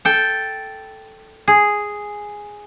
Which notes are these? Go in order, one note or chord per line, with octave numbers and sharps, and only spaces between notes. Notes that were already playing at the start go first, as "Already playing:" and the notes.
A4 G5
G#4